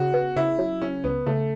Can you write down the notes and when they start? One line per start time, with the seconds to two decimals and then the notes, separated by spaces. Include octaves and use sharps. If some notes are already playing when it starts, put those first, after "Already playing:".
Already playing: C#3 F#4
0.14 B3
0.36 C#3 E4
0.58 F#3
0.81 C#3 C#4
1.04 C#2 B3
1.26 C#3 A3